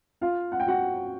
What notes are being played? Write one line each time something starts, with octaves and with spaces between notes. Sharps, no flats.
F4 F5
F#5
G5
F#4 F#5